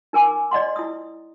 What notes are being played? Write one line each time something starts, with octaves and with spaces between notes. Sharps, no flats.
D#4 A#4 G#5 D6
D5 D#5 F#5 C6
E4 D#6